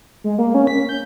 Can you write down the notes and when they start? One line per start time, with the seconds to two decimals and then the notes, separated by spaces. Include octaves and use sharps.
0.24 G#3
0.38 A#3
0.54 C#4
0.67 B6
0.89 G6